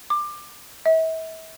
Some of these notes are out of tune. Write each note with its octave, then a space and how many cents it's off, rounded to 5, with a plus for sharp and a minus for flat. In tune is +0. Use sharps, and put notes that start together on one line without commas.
D6 +20
E5 -40